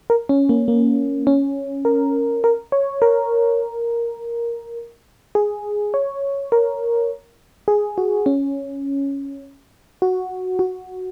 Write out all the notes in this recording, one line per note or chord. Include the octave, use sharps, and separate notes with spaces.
A#4
C#4
A#3
A#3
C#4
A#4
A#4
C#5
A#4
G#4
C#5
A#4
G#4
F#4
C#4
F#4
F#4